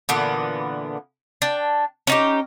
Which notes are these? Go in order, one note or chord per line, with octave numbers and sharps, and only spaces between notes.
A#2 D3 E3 B3
D4 G5
C#4 D#4 G4